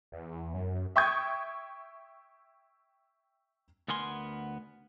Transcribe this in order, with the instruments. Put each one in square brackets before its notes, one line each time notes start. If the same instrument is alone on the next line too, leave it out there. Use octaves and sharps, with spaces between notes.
[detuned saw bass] E2
F#2
[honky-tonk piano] E5 G5 C#6 D#6 G6 G#6
[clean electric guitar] D2 B3 A#4 G#5 C6